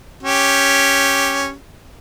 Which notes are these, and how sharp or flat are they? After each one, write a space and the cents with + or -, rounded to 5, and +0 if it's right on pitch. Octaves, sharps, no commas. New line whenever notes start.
C#4 +0 G4 +0